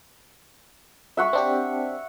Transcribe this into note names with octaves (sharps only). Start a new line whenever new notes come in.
E5 F#5 C#6
C4 D4 G4